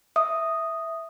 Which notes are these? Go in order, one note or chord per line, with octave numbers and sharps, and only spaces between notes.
E5 D#6